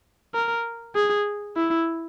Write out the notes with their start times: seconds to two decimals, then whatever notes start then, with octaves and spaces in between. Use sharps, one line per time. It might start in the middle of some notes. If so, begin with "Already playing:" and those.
0.34 A#4
0.96 G#4
1.56 E4